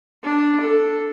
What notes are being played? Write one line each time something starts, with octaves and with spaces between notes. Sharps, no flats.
D4
A4